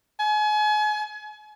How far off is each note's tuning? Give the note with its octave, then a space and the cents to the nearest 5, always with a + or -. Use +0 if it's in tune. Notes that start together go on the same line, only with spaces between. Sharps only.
G#5 +35